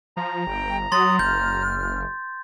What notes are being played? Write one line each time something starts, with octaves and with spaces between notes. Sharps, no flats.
F3 A#5
G1 G5
F#3 C6 D#6 A6
F#1 F6 G6